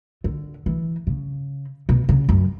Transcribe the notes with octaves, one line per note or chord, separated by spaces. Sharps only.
D3
E3
C#3
B2
C#3
F#2